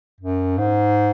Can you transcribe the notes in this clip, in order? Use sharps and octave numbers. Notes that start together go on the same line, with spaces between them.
F#2
G#2